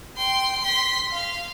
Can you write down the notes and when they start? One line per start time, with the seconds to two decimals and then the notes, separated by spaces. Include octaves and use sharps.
0.16 G5 C6
0.61 C6 B6
1.11 F5